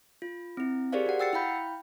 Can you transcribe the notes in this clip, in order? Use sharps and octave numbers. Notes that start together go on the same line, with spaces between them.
F4
C4 E4
G4 G#4 A#4 C5 D5 F5
F#4 F#5
F#5 G5 E6 A6 C7 C#7
E4 F5 G5 B5 G6